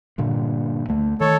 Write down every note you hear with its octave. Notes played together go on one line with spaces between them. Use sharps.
G2 A#2 D3
D2 A3
D#3 A4 C#5